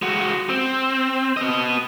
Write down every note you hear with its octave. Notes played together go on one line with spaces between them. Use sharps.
G#3 F#4
C4
B3 D#5